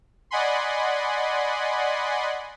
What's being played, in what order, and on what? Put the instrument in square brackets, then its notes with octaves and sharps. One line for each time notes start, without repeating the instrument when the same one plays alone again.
[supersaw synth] D5 D#5 F#5 G#5 B5 C6